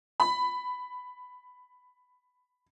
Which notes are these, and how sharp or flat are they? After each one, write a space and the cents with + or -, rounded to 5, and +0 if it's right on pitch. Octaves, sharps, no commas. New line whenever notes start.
B5 +10